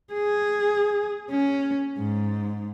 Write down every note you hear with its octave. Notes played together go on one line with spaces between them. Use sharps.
G#4
C#4
G#2